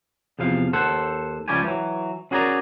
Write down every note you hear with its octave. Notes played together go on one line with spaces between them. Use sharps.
E2 C3 F3 F5
D#2 A4 C5 F#5
C#2 F3 G3 C#4 G4 G#5
E3 F#3
C#4 F#4 G#4 A#4 D5 A#5